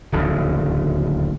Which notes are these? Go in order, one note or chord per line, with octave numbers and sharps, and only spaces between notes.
D1 A#1 D#2 C#3